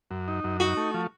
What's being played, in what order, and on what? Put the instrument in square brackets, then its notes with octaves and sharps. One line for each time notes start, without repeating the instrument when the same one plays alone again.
[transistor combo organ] F#2
D#4
F#2
[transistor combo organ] D#4 [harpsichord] F#4
[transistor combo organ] A3
F3